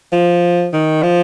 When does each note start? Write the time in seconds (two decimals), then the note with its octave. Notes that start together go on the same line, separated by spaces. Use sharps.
0.13 F3
0.73 D#3
1.03 F3